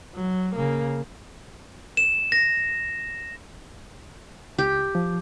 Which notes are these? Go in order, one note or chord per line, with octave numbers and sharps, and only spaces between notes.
F#3
C#3 A#3
E7
A#6
C#2 G4
F3